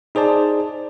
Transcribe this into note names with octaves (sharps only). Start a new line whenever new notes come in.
D#4 G#4 C5 D5 A5